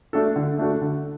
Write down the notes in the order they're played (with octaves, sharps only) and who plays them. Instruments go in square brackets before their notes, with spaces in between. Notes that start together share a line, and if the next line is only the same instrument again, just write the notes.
[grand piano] A3 D4 F#4 A4
D3
A3 D4 F#4 A4
D3